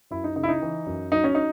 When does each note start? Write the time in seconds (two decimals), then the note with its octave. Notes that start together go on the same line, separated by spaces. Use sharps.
0.11 F#2 E4
0.24 D#4
0.36 C#3 D#4
0.43 E4
0.49 D#4
0.62 E3
0.86 F#2
1.12 F#3 D#4
1.24 C#4
1.35 D#4